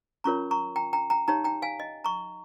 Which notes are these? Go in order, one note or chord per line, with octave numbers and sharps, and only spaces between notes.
C#4 F4 A#4 C#5 A#5 C#6
A#5 C#6
G5 A#5
G5 A#5
G5 A#5
D#4 G4 C#5 G5 A#5
G5 A#5
F5 G#5
D#5
A#5 C#6